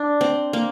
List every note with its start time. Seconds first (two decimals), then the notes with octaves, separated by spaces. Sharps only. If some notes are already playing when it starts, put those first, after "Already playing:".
Already playing: D4
0.21 C4
0.53 A#3